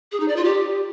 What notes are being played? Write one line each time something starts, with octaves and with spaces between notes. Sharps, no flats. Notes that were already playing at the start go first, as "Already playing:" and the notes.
G#4
D#4
D5
F4
G4